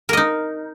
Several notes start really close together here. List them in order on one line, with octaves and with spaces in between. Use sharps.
A#4 D#5 D#4